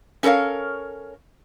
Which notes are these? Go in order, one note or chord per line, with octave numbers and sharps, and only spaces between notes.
C#4 A4 A#4 C#5 F5